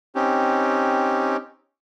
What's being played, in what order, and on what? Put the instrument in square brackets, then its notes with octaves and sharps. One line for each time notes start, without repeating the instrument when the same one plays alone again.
[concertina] C4 C#4 D#4 G4